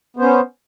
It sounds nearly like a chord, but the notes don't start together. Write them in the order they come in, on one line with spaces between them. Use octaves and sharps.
B3 C5 C#4